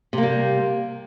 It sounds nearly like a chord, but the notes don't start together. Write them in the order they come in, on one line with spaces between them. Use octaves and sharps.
C3 A#3 G3